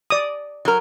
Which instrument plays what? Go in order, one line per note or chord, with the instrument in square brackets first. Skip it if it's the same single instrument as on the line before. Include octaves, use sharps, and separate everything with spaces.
[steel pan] D5 D#6
[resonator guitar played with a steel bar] F#3 A#4